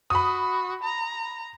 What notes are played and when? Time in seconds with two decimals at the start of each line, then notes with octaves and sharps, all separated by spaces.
0.10 F#4 B5 D#6
0.83 A#5